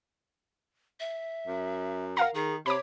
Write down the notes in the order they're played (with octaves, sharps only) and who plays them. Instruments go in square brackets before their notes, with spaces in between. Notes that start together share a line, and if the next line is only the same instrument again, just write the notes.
[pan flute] E5
[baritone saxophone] F#2
[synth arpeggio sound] A#4 F5 A#5 [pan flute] F#5
[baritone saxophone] D#3 [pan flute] G#4
[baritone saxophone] C3 [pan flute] C#5 [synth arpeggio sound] B5 D6